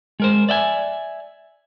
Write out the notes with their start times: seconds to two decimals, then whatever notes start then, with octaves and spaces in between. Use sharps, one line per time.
0.20 G#3 A#4 C5
0.49 D5 E5 G5 G#5